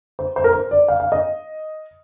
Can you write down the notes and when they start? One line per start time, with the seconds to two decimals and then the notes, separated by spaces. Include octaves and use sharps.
0.19 C5
0.36 C5
0.44 A#4
0.53 C5
0.71 D5
0.88 F5
1.00 F5
1.12 D#5